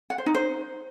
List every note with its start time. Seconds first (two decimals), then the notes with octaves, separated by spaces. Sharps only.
0.10 F#5
0.18 C5
0.26 D#4
0.35 C5